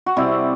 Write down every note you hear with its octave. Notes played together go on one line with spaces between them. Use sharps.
F#4
C3 G3 C4 E4